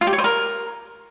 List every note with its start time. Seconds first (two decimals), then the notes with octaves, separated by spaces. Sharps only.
0.01 F4
0.07 G4
0.13 C#5
0.18 C5
0.24 A#4